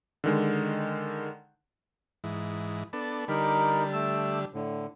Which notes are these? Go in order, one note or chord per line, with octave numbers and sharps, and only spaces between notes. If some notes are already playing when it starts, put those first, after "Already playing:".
D3 D#3 G#3
G#2 E3
B3 D4 A4
D3 G3 D#4 A#4 B5
A3 E6
A2 D3